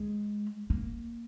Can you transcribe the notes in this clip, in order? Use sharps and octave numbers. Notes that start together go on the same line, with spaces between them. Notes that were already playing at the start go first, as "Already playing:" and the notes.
Already playing: G#3
A#3